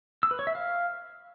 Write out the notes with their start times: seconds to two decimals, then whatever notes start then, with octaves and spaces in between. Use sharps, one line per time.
0.23 E6
0.31 B4
0.39 C#5
0.47 E5
0.55 F5